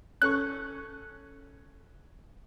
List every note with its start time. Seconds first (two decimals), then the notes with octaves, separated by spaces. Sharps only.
0.22 C#4 A4 C#6 F#6